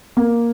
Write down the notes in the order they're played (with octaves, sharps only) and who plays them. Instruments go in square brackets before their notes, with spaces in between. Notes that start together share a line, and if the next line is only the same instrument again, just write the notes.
[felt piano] A#3